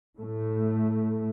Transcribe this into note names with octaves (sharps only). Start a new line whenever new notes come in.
A2 A3